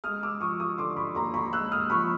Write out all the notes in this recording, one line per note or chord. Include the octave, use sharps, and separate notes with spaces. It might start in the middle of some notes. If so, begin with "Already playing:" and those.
G#3 D#6 F6
D6 E6
F3 C#6 D#6
C#6 D#6
D3 C6 D6
B5 C#6
D#2 A#5 C6
B5 C#6
G#3 E6 F#6
D#6 F6
F3 B5 C#6